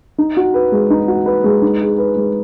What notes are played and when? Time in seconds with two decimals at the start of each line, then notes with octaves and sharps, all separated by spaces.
0.18 D#4
0.37 F#4
0.54 B4
0.72 G#3
0.90 D#4
1.08 F#4
1.26 B4
1.44 G#3
1.62 D#4
1.81 G#4
1.98 B4
2.16 G#3